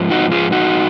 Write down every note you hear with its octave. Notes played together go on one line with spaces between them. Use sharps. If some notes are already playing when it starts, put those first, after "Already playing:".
Already playing: G#2 F3
D#4 F#4
F4 G#4
D#4 F#4